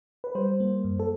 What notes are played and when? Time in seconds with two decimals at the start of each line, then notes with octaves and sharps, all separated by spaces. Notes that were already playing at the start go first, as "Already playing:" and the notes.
0.24 B4
0.35 G3 C5
0.60 A#3
0.84 F#2
0.99 A4